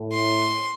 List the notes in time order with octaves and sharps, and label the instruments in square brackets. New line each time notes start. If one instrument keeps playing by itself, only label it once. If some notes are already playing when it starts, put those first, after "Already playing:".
Already playing: [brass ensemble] A2
[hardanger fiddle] C6